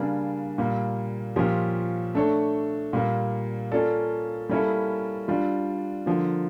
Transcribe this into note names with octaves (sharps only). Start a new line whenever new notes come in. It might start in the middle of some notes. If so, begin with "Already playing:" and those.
Already playing: C#3 G3 A#3 D4
A#2 G3 A#3
A#2 F3 C#4 G4 A#4
A3 D4 A4 C#5
A#2 G3 A#3
A#3 C#4 F4 A4 D5
G3 A#3 C#4 E4 A4
G3 D4 F4
D3 F3 A#3